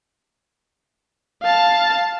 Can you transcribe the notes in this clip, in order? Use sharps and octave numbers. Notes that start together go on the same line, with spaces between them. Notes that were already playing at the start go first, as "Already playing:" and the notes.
F5 A5